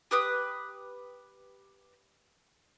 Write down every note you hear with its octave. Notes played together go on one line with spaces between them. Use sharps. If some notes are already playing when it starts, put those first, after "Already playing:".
G4 B4 D#6